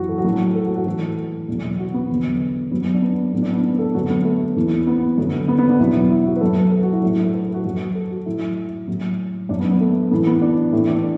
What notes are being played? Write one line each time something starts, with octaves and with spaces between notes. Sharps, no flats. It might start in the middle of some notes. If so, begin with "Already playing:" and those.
Already playing: F#2 E3 F#4
A4
F#4
A2 F#3 A4
A4
F#4
F#4
A2 E3 A4
E2 B2 F#3
F#4
B3
E2 D3 F#3
F#2 F#3 B3
B3
D4
B3
A2 F#3 B3
D4
B3
B3
A4
F#2 D3 F#3 F#4
B3
A3
E2 E3
B3
F#2 D3 F#3
B3
B3
D4
E2 B2 F#3 E4
E4
F#4
B4
F#2 F#3 A4
A4
F#4
E4
A2 F#3 D4
E4
A4
B4
A4
F#4
F#2 F#3 F#4
A4
F#4
A2 F#3 E4
A2 F#3
F#2 F#3 D4
B3
B3
A3
A2 E3 B3
B3
D4
A2 E3 E4
D4